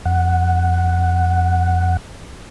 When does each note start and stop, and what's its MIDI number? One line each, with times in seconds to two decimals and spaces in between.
0.05 1.97 41
0.05 1.97 78